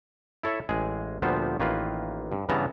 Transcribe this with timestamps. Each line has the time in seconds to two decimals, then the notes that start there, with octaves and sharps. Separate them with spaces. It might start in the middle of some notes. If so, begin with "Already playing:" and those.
0.43 E4 A4 C#5 E5
0.69 A1 G#3 G#4
1.22 D2 A#2 F3 G3 B3 C5
1.60 A1 D#3 A#3 F4 B4
2.32 G2
2.49 G2 C#3 E3 B3 A5 A#5